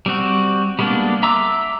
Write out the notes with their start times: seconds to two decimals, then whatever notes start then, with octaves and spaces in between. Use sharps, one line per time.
0.06 G3 C4 F#4
0.79 G3 G#3 A#3 B3 D4
1.23 E5 A#5 C6 D6 E6